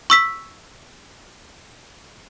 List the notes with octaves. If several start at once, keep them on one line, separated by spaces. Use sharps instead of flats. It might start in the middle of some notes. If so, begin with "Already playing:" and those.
C#6 E6 B6